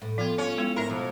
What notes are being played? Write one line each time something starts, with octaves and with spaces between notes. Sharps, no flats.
A2
F3 B3 F4
C#4 F4
G#3 B3 E4
G#2 D4 E4 A#4 E5
F2 B2